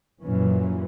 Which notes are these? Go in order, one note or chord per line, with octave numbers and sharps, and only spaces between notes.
F#2 A#2 E3 C#4